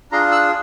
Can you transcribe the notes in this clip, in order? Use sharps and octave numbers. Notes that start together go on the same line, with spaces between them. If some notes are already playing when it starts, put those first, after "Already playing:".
D4 F4 G#4 A#5 C6
E6 F#6